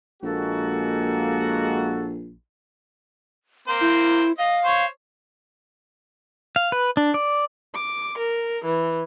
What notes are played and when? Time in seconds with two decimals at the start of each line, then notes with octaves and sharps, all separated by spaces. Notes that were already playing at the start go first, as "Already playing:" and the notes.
0.23 A#1 G#3 A#3 F#4 A4
3.68 A#3 C4 C5
3.81 E4
4.38 D#5 F5
4.65 C5 C#5
6.56 F5
6.72 B4
6.97 D4
7.14 D5
7.74 D6
8.18 A#4
8.65 E3